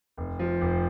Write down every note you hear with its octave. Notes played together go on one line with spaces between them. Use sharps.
F1
F3
F1